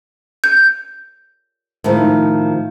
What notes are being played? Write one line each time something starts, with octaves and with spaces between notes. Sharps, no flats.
G6
A2 D#3 F3